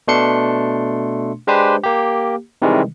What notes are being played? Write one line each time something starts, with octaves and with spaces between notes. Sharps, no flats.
B2 A3 D4 C6 C#7
G#3 D4 G4 B4 C5
A#3 G4
C3 D#3 E3 G3 G#3